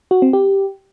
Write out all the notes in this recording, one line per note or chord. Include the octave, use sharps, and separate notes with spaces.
F#4
C4
G4